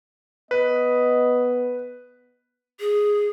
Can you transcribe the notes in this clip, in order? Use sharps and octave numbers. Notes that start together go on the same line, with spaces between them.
B3 B4 D#5
G#4